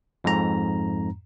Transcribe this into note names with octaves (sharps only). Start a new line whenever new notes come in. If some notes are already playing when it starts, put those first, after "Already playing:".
F2 G#2 A#5